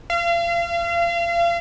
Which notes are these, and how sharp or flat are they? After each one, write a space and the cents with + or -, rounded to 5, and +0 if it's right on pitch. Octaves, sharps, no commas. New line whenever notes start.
F5 -35